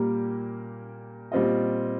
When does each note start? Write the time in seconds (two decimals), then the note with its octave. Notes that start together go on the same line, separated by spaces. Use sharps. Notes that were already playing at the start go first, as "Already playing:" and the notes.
Already playing: A#2 G3 A#3 G4 A#4
1.32 A#2 G3 C4 F4 D#5